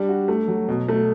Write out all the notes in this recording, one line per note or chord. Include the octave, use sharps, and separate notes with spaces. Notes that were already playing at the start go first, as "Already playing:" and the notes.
Already playing: G3 D4
F#4
A3
F#3
B2
A3